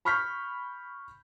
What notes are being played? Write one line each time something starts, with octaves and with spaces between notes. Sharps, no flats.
B5 C#6 F6 G6 B6